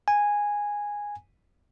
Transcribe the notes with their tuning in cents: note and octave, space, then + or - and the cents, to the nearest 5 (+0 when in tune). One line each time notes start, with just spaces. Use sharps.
G#5 -10